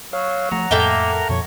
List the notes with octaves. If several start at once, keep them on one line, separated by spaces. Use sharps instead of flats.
F#3 C#5 F5
F3 A3 F#5 A#5
F2 A2 A#3 A4 E5 G5
A#4
F2 A#2 F3 C#5